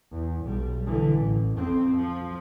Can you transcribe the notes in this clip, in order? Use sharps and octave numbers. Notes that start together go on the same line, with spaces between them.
E2
B1 G3
D3 E3
A1
F2 C4
F3